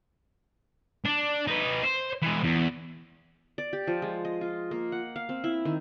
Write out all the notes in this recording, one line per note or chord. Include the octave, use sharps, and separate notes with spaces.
D4
D#4 B4
C5
E3 G#3
E2
D5
G4
F3
G#3
D#5
F4
A#3
F#5
F5
C4
E4
D#3